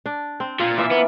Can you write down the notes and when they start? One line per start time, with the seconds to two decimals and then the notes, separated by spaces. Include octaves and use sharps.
0.06 D4
0.40 C4
0.60 A#2 F4
0.78 E3 F4 D5 E5
0.91 A#3 B3